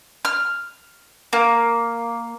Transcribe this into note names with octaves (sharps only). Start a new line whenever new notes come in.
F6
A#3